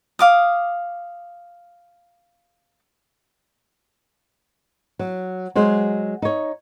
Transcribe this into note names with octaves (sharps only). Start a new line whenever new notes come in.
F5 D6 D#6
F#3
F#3 G#3 C5
D#4 C#5